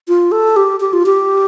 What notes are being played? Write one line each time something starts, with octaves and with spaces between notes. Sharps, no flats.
F4
A4
G4
G4
F4
G4